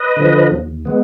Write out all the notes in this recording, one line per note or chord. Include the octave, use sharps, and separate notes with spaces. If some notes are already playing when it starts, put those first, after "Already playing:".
Already playing: B4 D#5
D3 F3
D#2
G#3 B3